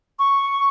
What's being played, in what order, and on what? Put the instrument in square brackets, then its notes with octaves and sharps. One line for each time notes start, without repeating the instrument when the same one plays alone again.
[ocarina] C#6